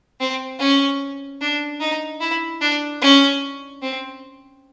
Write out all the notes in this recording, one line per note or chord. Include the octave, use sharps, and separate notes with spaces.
C4
C#4
D4
D#4
E4
D4
C#4
C4